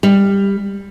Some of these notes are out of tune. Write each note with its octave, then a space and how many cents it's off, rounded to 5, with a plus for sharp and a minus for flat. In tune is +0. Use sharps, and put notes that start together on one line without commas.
G3 +15